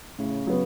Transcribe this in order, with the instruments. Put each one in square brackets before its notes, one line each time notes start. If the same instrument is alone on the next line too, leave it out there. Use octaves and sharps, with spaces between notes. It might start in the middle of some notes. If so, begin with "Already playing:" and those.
[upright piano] A2 [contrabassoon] C#3
[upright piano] F#3 B3